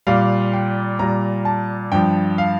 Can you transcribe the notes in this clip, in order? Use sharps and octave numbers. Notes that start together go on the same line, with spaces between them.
A#2 G3 F5
G5
A#2 G3 A#5
A5
G2 F3 G5
F5